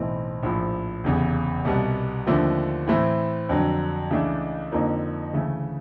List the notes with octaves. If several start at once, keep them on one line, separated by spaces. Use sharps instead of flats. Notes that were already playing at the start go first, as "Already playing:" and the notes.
Already playing: B1 A2 E3 A3 C4
A#1 A2 F3
F1 E2 C#3
C2 B2 G3 B3
D#2 D3 F3 A3 C4
A2 E3 A3 C4
F2 D3 F#3
C#2 C#3 E3 A3 D4
F2 D3 F3 A#3 D#4
D2 C#3 E3 A3